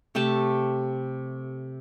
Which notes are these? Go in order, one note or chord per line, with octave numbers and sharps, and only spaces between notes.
C3 A3 G4 A5